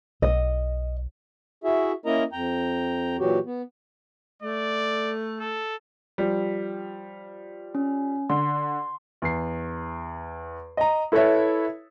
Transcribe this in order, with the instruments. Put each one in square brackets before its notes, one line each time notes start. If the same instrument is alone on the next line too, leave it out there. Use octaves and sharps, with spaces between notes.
[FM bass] B1 [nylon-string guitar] D#5
[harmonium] E4 F#4 G#4 E5
A#3 C#4 E4 A#4 D#5 A#5
F2 G5 A#5
A#2 E3 F#3 F#4 G4
B3
[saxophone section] A3 [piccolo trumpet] D5
[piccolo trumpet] A4
[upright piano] F3 G3
[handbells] C#4
[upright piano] D3 [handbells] C6
[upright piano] E2 C7
D#5 A#5
E4 A4 B4 C#5 E5